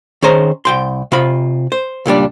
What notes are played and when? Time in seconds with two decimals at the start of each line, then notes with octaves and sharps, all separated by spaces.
0.22 D#3 C#4 G#4 C5 A#5
0.65 C2 G5 C6
1.12 C3 F4 B5
1.72 C5
2.06 C#2 A#2 G3 D4